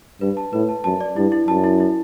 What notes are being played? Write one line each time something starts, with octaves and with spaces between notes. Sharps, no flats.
G2 B4
A5
A2 B4
A5
F#2 A5
D5
G2 E4
E4
F#2 A5
E4
E4